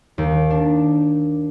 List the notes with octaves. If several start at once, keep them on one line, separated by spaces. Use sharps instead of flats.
D#2
D4